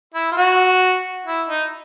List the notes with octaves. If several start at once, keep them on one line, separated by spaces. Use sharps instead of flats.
E4
F4
F#4
E4
D#4